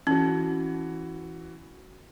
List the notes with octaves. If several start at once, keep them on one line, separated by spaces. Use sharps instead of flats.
E3 C#4 F#4